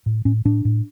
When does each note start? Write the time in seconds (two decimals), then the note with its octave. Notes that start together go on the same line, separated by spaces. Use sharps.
0.06 A2
0.25 A2 C#4
0.45 A2 D4
0.65 A2